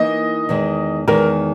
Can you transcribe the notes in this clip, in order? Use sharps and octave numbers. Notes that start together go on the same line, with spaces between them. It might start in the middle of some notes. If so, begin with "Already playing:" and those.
Already playing: E3 A#3 D#4 A#4 D#5
E2 D#3 G#3
E2 D#3 G#3 A#4